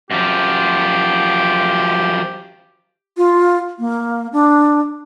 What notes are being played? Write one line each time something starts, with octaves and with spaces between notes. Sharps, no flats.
F#2 F3 G4
F4
A#3
D4